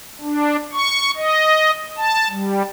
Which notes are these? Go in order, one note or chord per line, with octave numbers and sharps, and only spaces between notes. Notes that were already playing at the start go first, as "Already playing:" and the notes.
D4
C#6
D#5
A5
G3